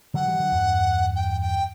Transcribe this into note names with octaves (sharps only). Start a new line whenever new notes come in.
D3 F#3 F#5
E3 G3
D3 F#3
E2 G2
G5
G5